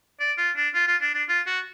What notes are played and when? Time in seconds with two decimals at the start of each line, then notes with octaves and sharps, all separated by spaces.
0.20 D5
0.38 F4
0.56 D4
0.75 F4
0.87 F4
1.02 D4
1.14 D4
1.29 F4
1.47 F#4